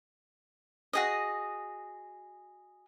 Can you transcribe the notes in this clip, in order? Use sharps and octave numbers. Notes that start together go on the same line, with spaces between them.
F#4 G#4 D#5